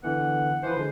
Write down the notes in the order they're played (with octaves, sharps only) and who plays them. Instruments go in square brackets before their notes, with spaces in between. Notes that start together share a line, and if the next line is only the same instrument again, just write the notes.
[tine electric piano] D3 E3 B3 [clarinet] F#5
[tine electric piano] E3 F3 B4 [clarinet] C5
[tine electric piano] D3 G#3